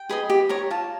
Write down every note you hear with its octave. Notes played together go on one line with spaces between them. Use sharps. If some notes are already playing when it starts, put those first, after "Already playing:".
Already playing: G5
G#4 B4 D#5
G4
A#4 C#5
F4 A5